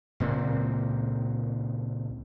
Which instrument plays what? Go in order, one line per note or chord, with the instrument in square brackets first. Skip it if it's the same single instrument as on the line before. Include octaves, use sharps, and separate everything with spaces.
[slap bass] C#2 A#2 A#3 C4